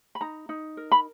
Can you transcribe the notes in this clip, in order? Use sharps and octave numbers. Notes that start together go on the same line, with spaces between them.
B5
D#4 A#5
D#4
A#4
B5